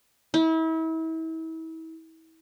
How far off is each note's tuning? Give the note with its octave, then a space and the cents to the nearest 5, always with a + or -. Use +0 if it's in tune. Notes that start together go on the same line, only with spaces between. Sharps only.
E4 -35